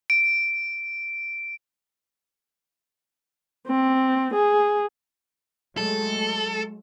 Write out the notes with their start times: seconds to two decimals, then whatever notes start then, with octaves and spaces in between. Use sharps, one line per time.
0.10 D7
3.68 C4
4.34 G#4
5.77 F#3 G#3 A3 A4